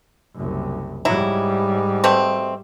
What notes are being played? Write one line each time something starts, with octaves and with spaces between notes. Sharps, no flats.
F#1 C2
G#2 F#3 G3 E4
B2 A3 C4